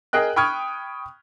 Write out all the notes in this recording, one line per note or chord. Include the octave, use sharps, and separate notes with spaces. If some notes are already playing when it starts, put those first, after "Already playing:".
G#4 A#4 D#5 G5 F#6
G5 B5 C#6 D#6 F6 G#6